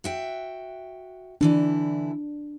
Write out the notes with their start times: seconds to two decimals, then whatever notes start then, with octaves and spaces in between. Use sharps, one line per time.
0.04 F#4 E5 G5
1.41 D3 E3 D4 E4